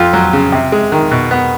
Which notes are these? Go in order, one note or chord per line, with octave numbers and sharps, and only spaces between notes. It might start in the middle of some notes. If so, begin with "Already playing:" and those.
Already playing: F2 F4
F#3
C#3
C3
G#3
D#3
B2
B3